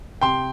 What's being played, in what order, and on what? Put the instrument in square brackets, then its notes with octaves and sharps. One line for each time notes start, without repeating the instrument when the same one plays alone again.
[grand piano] C3 G5 C6